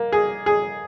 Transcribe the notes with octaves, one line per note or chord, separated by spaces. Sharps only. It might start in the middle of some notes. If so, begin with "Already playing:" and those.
Already playing: A#3
G#4
G#4